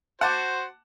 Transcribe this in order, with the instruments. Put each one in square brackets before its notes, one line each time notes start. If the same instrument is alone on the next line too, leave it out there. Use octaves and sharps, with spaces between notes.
[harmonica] F#4 C5 [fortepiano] F#5 A5 D6